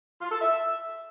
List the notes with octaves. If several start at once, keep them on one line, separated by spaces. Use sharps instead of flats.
F4
A4
E5